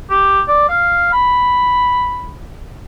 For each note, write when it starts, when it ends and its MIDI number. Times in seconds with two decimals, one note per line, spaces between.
0.10 0.41 67
0.48 0.67 74
0.69 1.10 77
1.12 2.34 83